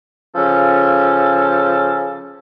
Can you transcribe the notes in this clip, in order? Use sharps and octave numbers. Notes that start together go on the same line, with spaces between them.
C#3 F3 C#4 A4